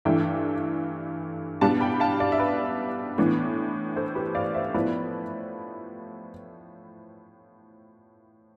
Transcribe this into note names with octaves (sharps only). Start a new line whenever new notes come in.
G2 E3 A3 D4 E5 G5
B2 G3 B3 D4 F5 A5
G5 B5
F5 A5
D5 F5
E5
B4 D5
A2 E3 B3 D4
A4 C5
G4 B4
D5 F5
C5 E5
A2 F3 B3 E4 B4 D5